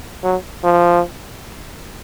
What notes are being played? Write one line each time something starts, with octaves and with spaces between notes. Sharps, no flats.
F#3
F3